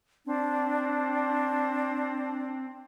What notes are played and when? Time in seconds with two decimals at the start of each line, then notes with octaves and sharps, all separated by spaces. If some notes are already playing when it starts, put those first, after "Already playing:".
0.26 C4 D4